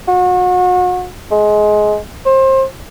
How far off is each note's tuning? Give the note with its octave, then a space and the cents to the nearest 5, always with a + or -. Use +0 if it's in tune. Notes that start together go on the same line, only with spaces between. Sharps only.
F#4 -35
G#3 +20
C5 +30